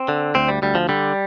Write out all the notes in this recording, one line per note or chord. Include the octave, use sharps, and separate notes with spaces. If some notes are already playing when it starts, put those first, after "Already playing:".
Already playing: C4
D3
D2 C4
G3
D2 G3
F3
D3 G3